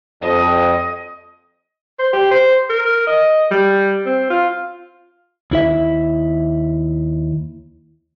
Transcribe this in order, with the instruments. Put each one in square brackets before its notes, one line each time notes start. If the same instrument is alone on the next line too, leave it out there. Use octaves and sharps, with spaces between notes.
[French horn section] F2 [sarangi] D#5
[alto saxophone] C5
G4
C5
A#4
D#5
G3
C4
F4
[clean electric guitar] D#2 E4 E5